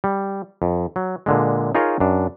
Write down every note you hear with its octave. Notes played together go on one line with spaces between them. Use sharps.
G3
F2
F#3
A#2 D3 G#3
D#4 F4 G#4 A#4 C#5 D#5
F#2 D4